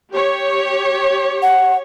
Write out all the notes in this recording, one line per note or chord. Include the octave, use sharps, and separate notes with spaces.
G4 C#5
F#5